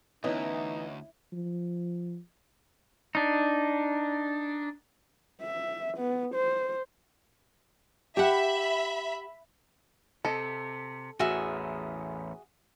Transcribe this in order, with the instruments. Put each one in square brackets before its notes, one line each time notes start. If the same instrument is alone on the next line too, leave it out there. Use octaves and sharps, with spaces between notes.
[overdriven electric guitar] D2 [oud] E3 [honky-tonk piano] B3 C#4 D#5 [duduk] D#4
[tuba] F3
[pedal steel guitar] D4 D#4
[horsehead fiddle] E5
B3
C5
[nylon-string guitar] G4 F#5 [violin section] E5 B5
[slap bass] C3 [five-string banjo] A4 D#5
[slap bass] A1 E2 [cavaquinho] F#4 G#4 E5